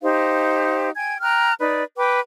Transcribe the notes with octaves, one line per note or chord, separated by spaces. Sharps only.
D#4 G4 C5 F5
G5 G#5 G#6
G5 A#5 F6 F#6
D#4 B4 D5
B4 G5 D6